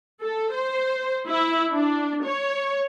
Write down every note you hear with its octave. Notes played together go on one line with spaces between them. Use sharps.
A4
C5
E4
D4
C#5